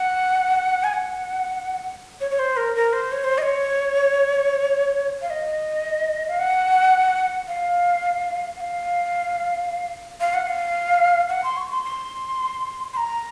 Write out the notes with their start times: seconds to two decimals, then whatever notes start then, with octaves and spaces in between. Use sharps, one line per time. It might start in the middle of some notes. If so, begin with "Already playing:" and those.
Already playing: F#5
0.84 G#5
0.93 F#5
2.21 C#5
2.31 C#5
2.39 C5
2.57 A#4
2.75 A#4
2.93 C5
3.12 C#5
3.24 C5
3.38 D#5
3.42 C#5
5.21 F5
5.30 D#5
6.28 F5
6.39 F#5
7.47 F5
8.57 F#5
8.60 F5
10.20 F5
10.34 F#5
10.47 F5
11.29 F#5
11.43 C6
11.57 C#6
11.71 C6
11.84 C6
12.93 C6
12.97 A#5